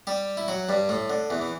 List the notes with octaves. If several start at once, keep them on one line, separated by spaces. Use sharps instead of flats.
G3 G4
E4
F#3 F#4
G2 G3
A2 A3
D3
E2 E3
E3